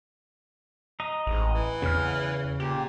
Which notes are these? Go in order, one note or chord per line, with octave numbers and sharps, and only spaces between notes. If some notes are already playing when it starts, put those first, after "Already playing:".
D#5 A#5
A1 G#2
E3
E2 C#3 F6
A#2 G4